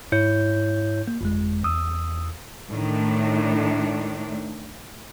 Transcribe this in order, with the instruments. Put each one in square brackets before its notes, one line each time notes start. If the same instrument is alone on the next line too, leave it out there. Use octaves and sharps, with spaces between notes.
[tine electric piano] G#2 E4 C#5 G6
A#3
G1 F2 G#3
E2 D#6 E6
[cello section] A2 D#3 A3 D4